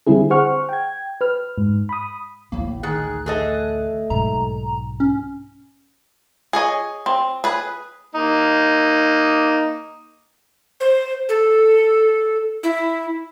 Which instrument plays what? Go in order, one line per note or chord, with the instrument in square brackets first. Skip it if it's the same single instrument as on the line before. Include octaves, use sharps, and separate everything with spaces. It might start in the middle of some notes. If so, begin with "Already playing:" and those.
[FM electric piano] D3 G3 C4 E4 G#4
G#4 C5 F#5 C#6 F6
G5 G#6
B4 F6
G#2
B5 D#6
[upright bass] A1 D2 [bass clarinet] A2 [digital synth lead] A#3
[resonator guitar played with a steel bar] D#3 [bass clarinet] G#4 [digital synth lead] F#6
[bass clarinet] A3 [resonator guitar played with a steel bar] G#4 A4 D#5
[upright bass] B1 G#2 [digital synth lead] A#5
[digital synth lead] C#4
[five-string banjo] G#4 C#5 D#5
C4
G#4 B4
[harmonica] A#3 D#4
[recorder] C5
A4
E4